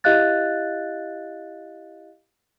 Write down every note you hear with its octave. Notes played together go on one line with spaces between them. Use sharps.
E4 G4 D#5 F5 F#6 A6